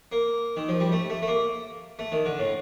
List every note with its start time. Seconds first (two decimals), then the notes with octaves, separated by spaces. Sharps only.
0.12 A#3
0.57 D#3
0.69 F3
0.80 G3
0.92 A3
1.10 A3
1.22 A3
1.27 A#3
1.99 A3
2.12 D#3
2.25 D3
2.39 A2